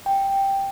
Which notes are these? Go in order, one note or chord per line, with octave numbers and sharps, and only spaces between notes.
G5